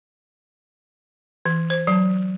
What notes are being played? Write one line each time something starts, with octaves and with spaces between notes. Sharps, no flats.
E3
C5
F#3